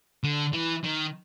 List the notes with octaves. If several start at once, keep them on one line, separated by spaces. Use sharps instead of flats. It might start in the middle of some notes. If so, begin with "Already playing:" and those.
D3
E3
D#3